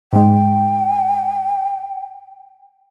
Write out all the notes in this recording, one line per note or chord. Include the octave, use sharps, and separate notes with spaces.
G#2 G#3 G5